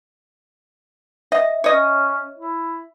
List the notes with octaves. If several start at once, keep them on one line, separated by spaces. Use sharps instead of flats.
D#5 E5
C#4 C#5 D#5
E4